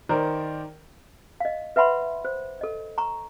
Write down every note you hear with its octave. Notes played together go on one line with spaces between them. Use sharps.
D#3 A#4 C5 D5
D#5 F5
B4 E5 F#5 B5 C6
C5
A4 D#5
A#5 C#6